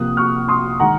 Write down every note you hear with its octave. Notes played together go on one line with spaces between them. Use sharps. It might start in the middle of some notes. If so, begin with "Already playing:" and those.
Already playing: C3 F3 A#3 D#6 F#6
C#6 F6
C6 D#6
D#3 G#3 F#5 A#5